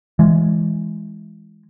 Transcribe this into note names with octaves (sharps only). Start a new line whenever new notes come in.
E3 G#3